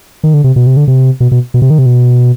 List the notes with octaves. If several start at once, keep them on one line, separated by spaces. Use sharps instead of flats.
D#3
D3
C3
B2
C3
D3
C3
B2
B2
B2
C3
D#3
C3
B2